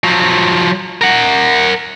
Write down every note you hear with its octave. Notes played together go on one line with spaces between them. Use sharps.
F3 F#3
A#4 F#5